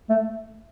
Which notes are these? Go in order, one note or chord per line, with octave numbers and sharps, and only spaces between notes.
A3